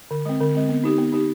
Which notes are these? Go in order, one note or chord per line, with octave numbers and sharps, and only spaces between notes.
D3
G#3 C4
D3
G#3 C4
B3
D#4 G4
B3
D#4 G4